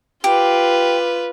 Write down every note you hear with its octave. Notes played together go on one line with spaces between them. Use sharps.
F4 G4 B4